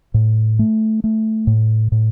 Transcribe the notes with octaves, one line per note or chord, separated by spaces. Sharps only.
A2
A3
A3
A2
A2